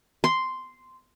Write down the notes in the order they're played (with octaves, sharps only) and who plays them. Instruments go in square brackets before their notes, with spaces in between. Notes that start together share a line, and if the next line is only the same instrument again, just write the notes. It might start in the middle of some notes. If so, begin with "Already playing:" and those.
[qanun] C6